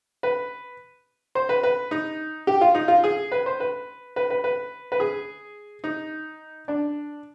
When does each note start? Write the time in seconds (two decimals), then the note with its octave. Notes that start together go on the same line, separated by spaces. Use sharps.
0.23 B4
1.35 C5
1.49 B4
1.63 B4
1.91 D#4
2.47 G4
2.61 F4
2.75 D#4
2.88 F4
3.04 G#4
3.32 B4
3.46 C5
3.60 B4
4.16 B4
4.30 B4
4.44 B4
4.92 B4
5.00 G#4
5.84 D#4
6.68 D4